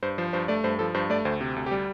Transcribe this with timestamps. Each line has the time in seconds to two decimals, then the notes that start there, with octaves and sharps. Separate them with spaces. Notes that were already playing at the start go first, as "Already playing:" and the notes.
0.03 G2 C5
0.18 F3 C5
0.33 G2 C5
0.48 A3 D5
0.64 G2 C5
0.79 F3 A4
0.94 G2 C5
1.10 A3 D5
1.25 D2 C5
1.41 C3
1.56 D2
1.66 G4
1.71 G3